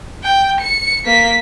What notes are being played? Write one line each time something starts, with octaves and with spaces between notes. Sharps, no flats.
G5
C#7
A#3 B6